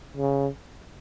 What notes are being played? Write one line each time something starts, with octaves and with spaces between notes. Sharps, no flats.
C#3